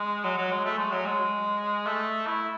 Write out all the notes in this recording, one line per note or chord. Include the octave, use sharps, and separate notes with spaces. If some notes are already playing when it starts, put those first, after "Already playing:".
Already playing: G#3
F#3
F#3
G#3
A3
G#3
F#3
G#3
A3
E4